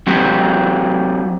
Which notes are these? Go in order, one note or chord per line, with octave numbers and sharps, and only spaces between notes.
F#3 C4 F#4 G4